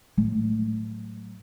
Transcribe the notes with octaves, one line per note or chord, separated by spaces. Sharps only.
A2 F#3